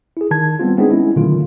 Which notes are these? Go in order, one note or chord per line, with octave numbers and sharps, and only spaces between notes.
E4 G#4
D#3 A5 G#6
G3 B3 C4 F4
G#3 B3 C4 D4 D#4 G#4
G#3 C#4 E4
A#2 D3 D#3 F#3 A3 F4